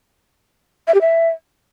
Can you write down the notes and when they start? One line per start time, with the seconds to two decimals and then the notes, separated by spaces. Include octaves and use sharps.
0.87 E5
0.94 G4
1.01 E5